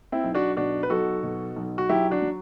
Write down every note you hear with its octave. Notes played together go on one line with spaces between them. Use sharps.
C4 E4
B1
D4 F#4
B2 D4 F#4
B4
B1 F#4 A4
B2
B1
F#4
F#3 E4 G4
D4 F#4
F#3